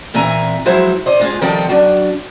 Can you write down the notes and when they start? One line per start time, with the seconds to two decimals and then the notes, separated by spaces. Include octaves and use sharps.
0.14 A#2 E3 C4 E5 G#5 A#5
0.65 F3 F#3 G#3 E4 C5
1.06 C5 D5 D#5
1.20 G#3 F4 G#4
1.41 D#3 F3 G3 C4 A4 G5
1.69 F#3 D4